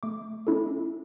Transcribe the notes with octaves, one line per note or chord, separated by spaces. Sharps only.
A3 D6
C#4 E4 A4